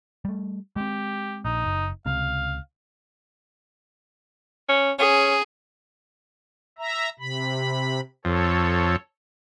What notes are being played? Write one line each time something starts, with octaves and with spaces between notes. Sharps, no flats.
G3 A3
G#3 C4 G4
A#1 D#4
F#1
C#2 C3 F5
C#4
C#4 G#4
E5 A#5
C3 B5
F2 A4 C#5